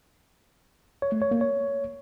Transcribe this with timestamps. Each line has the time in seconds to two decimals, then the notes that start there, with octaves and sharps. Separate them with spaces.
1.02 C#5
1.12 A3
1.22 C#5
1.31 A#3
1.41 C#5